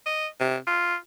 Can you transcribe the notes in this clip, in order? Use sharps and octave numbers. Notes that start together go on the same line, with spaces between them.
D#5
C3
F4